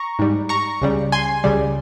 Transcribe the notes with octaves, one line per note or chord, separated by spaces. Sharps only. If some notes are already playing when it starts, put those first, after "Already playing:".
Already playing: A#5 C#6
G#2 G3
A#5 C#6
C#2 C#3 G3
G#5 C6
C#2 C#3 G3